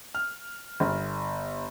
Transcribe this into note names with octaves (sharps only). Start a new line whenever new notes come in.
F6
G1